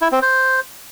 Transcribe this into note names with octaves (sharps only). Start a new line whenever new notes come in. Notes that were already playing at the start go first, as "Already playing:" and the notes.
E4
C4
C5